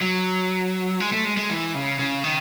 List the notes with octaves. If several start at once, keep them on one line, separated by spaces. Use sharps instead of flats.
F#3
G#3
A3
G#3
G#3
E3
C#3
C#3
D#3